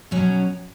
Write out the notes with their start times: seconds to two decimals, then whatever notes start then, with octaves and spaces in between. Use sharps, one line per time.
0.11 B2 F#3 C#4